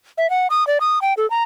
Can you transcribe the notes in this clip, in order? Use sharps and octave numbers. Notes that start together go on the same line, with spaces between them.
E5
F#5
D#6
D5
D#6
G5
A4
A#5